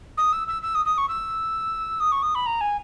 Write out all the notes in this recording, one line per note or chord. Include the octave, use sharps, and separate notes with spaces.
D#6
E6
E6
E6
D#6
D#6
C#6
E6
D#6
C#6
D#6
B5
A#5
G#5